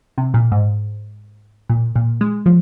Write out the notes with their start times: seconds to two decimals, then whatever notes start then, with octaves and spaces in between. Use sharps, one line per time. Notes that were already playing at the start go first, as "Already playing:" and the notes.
0.18 C3
0.34 A#2
0.52 G#2
1.69 A#2
1.96 A#2
2.21 G#3
2.46 F3